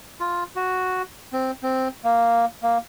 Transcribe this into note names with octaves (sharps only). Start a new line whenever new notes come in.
F4
F#4
C4
C4
A#3
A#3